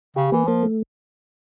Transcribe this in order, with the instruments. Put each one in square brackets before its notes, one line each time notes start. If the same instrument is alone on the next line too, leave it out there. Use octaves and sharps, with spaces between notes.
[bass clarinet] C#3 [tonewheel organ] G4
[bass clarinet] E3 [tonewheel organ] A#3
[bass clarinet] F3 [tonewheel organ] A#3
[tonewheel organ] A3